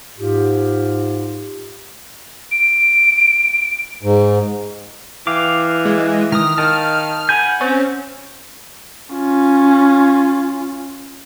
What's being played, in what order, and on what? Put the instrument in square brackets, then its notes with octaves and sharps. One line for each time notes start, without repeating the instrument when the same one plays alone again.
[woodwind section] G#2 F4 G4
[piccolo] D7
[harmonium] G#2
[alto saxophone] E3 [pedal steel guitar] F5 G5 D6
[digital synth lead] G#3
[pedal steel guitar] D#3 D#6 [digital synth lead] F6
[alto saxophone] D#3 [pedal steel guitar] F5 A5
[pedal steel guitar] F#5 B5 G6 [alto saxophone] G#5
[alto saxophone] C4 [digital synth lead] C#4
[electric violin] C#4 F4